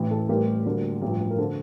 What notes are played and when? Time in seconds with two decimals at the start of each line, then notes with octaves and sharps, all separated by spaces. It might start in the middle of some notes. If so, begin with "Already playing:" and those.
Already playing: A1 A2 E3
0.11 A4
0.29 A1 A2 G3 G4 A#4
0.65 D2 D3 G3 A#3
1.02 A1 G2 F3
1.30 A#4
1.38 D3 A4 C5